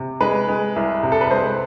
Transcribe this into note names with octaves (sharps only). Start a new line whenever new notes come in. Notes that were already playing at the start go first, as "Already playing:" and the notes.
Already playing: C3
G#3 B4
G#3
C2
C3
A4
B4
G#3 C5